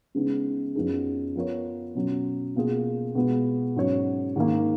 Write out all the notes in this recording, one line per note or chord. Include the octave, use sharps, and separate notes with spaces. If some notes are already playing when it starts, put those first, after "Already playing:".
C#3 G#3 B3 D#4
F#2 F3 B3 D#4 G#4
F3 B3 F4 A#4 C#5
B2 F#3 C#4
B2 A#3 F4 G#4
B2 G#3 B3 F4
G#2 F#3 C#4 F#4 C#5
G#2 D#3 A#3